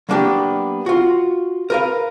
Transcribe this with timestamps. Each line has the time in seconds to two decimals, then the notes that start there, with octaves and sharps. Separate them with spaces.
0.09 F#3 A#3 B3 D4 F#4 G4
0.86 F4 F#4
1.70 A#4 B4 F5